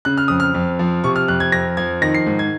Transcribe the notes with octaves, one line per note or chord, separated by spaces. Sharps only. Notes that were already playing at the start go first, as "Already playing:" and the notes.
C#3 F#6
F6
F2 D#6
F6
F2
F3
C3 C#6
F6
F2 F#6
G#6
F2 A#6
F3 G#6
D#3 A#6
C7
G#2
G#6